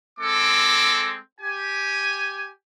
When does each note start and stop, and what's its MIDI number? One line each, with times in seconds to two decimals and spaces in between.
0.19 1.17 56
0.19 1.17 60
0.19 1.17 69
0.19 1.17 86
1.41 2.49 67
1.41 2.49 80